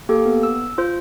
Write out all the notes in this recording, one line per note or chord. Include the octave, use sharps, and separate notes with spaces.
A#3 G4 A4
B3
E6
F4 C5